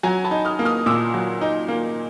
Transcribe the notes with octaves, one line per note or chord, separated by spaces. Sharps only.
F#3 G#5 A#5
A5 B5
D#4
D#6 F6
A#3
D#6 F6
A#2 D6 E6
F#3
D#4
A#3